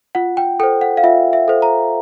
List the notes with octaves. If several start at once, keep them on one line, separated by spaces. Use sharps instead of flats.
F4 F#5
G5
A4 C5 G5
F#5
F5
F4 E5
E5
A4 C5
A#5